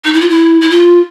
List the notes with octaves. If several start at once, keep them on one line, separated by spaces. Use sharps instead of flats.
D#4
E4
F4
E4
E4
F4